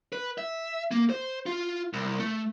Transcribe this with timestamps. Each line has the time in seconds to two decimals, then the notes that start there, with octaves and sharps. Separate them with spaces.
0.13 B4
0.38 E5
0.91 A#3
1.10 C5
1.46 F4
1.93 C2
2.20 A3